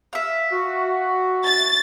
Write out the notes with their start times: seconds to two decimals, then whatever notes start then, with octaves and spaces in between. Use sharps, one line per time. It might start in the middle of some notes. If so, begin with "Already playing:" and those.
0.13 E5 F5
0.52 F#4
1.45 A6